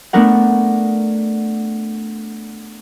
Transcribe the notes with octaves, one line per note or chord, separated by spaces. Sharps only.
A3 B3 D4 A#4 F#5